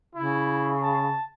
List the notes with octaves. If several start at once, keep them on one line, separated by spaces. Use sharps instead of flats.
C#3 E4
A5